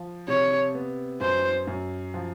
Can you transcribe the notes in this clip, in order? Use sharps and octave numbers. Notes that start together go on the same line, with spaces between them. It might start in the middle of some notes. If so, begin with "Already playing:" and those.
Already playing: F3
C3 C#5
B3
F#2 C5
F#2
F3